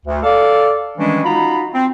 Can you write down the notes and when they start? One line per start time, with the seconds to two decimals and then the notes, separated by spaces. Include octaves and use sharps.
0.05 D2
0.23 A4 D5 F5
0.98 D#3 E3 G3 G#3 C#4 D4
1.24 D#4 F4 F#4 A#5 B5
1.73 C4